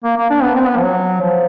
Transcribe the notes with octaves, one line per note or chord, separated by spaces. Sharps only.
A#3
A#3
D4
B3
C4
B3
F3
F#3
F3